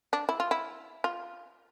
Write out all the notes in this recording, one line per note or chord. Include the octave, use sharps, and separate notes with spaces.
D4
E4
F4
E4
F4